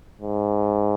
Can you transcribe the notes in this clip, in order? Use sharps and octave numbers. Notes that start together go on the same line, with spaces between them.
G#2